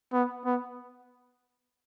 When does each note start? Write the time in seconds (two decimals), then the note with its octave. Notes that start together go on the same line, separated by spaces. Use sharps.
0.13 B3
0.45 B3